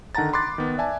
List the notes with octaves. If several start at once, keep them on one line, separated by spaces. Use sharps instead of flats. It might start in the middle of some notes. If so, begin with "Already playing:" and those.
D3 D#3 F#5 A5 A#5 A6
B5 C6 D6 F#6 A6
D#3 B3
D5 E5 G#5 A5